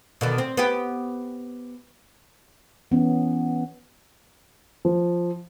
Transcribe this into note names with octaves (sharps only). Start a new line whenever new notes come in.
B2 D3 D#3
C4
B3 G4
E3 B3 C#4
F3